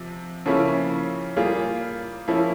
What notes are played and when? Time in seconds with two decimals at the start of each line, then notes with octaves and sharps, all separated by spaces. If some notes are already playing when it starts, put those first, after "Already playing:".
Already playing: C3 F3
0.46 C#3 F3 A#3 C#4 E4
1.36 G3 A#3 F4 G#4
2.28 F3 A#3 C#4 E4